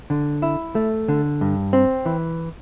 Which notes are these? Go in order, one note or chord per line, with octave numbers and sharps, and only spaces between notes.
D3
E4
A3
D3
G2
C4
E3